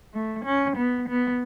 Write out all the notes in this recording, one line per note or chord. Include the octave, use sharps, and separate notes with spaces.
A3
C#4
B3
B3